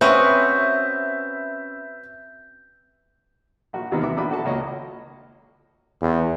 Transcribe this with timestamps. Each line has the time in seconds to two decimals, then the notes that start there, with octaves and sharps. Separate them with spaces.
0.01 C4 C#4 F#4 B4 D#5 E5 B5 G6
3.73 A#1 F#4
3.92 D#2 C3 E3 A#3 B3 D#4
4.03 E3 B3 E5 F#5 D6
4.16 A#1 B2 D4 E5 B5 D6
4.31 F#4 A4 A5 A#5
4.45 C#2 A#3 C#5 D#5 B5
6.01 E2